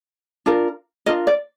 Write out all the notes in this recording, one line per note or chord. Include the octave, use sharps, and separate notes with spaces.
D4 F4 A#4
D4 F4 A#4 D#5
D5